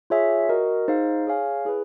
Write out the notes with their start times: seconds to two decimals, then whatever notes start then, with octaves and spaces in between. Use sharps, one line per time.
0.10 F4 G#4 C#5 E5 G#5
0.49 F#4 A#4 D#5
0.88 D#4 G#4 C5 F5
1.27 G#4 C#5 F5 G#5
1.65 E4 G#4 B4